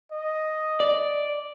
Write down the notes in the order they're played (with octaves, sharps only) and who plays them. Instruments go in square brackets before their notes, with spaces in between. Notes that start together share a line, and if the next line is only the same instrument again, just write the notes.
[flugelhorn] D#5
[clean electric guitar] D5